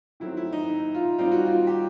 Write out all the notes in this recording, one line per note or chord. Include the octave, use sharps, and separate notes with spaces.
D#3 F#3 A3 C4 E4
E4
D#4
F4
D#3 G3 C4 D#4 F4
F#4
F4
G4